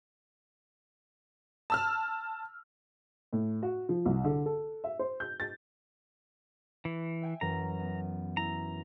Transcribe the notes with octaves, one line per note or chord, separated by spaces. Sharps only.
A5 E6 F6
A2
F#4
F3
C2
D3
A4
E5
C5
G6
A6
E3
E5 G5 G#5
F#2 E3 A#5
B3
E4 A#5